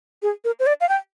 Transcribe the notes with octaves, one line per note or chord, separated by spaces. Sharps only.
G#4
A#4
C5
D5
F5
G5